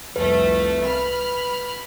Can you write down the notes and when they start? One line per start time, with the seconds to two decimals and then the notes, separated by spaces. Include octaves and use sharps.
0.16 C2 F2 A3 B4
0.83 B5 F6